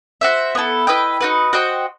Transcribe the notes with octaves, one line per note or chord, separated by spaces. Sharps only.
F#4 C5 E5
B3 E4 A4
E4 B4 D#5 G5
D#4 F#4 B4
F#4 C5 D#5 G5